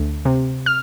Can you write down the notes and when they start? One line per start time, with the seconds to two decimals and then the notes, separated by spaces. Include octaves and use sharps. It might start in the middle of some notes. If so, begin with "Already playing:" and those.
Already playing: D2
0.25 C3
0.66 F6